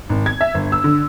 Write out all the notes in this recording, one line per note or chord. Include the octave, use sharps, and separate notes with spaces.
G#1
G#6
E5
G1
E6
D3